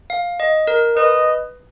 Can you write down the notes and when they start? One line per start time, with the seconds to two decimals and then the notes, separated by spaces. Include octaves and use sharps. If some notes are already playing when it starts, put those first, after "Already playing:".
0.10 F5
0.40 D#5
0.67 A#4
0.96 B4 D#5